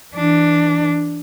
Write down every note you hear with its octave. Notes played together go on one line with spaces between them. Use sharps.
E3 D4